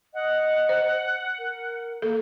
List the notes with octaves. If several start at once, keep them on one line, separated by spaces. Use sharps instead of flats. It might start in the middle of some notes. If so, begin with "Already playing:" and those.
D#5 F#5
C5
A#4
A#3 A4